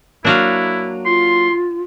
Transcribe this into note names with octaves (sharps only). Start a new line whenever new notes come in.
F#3 A#3 D4 E4 F#4 F5
F4 C6